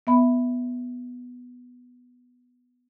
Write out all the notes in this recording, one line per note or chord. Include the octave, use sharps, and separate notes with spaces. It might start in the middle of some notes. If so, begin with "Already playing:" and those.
B3 E5 B5